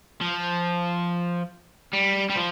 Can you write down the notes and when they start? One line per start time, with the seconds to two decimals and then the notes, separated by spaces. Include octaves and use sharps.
0.21 F3
1.93 G3
2.29 G3
2.35 F3